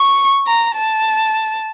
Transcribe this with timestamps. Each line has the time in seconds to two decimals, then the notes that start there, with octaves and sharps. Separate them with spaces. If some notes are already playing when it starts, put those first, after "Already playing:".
Already playing: C#6
0.47 A#5
0.77 A5